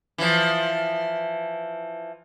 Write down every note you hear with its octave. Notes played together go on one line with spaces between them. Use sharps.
E3 F3